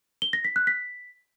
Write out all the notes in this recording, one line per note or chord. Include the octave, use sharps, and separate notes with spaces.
G7
A#6
B6
F#6
B6